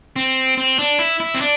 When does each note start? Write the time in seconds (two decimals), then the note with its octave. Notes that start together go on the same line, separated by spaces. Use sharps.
0.16 C4
0.58 C4
0.79 D4
0.99 E4
1.20 E4
1.35 C4
1.41 D4